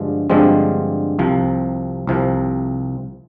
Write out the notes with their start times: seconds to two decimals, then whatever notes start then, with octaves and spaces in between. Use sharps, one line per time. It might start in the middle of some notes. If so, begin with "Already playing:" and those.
Already playing: G2 D3 F3 G#3
0.30 G2 D3 F3 G#3 C4
1.19 C2 C3 F3
2.07 C2 C3 F3